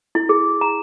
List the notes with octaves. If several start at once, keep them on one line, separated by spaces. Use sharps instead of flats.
E4
G#4
A#5